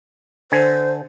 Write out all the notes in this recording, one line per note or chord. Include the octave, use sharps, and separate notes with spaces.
D3 C5 G#5